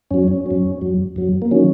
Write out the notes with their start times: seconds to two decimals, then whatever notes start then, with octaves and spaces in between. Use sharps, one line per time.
0.11 F#2 F#3 C#4
0.28 C#4
0.46 F#2 F#3 C#4
0.81 F#2 F#3
1.16 F#2 F#3
1.42 A#3
1.51 D#3 F#3 C#4